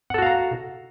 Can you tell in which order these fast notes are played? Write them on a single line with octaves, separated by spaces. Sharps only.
F#5 A4 F#4 F5 A#5